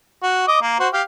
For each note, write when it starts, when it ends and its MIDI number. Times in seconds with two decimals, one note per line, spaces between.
0.23 0.43 66
0.48 0.59 75
0.48 0.59 86
0.62 0.75 58
0.80 0.88 66
0.80 0.88 72
0.93 1.02 67
0.93 1.02 77